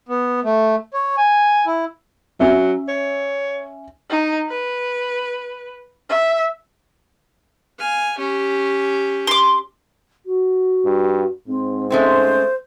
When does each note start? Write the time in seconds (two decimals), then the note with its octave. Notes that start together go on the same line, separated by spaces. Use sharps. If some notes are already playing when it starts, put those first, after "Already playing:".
0.09 B3
0.44 A3
0.93 C#5
1.17 G#5
1.66 E4
2.40 F#3 C#4 E5
2.88 C#5
4.10 D#4
4.49 B4
6.10 E5
7.78 F5 G#5
8.18 C#4 G4
9.27 C6 D6
10.26 F#4
10.85 G2
11.47 G#2 C4
11.90 G#3 A3 C4 C#4 C5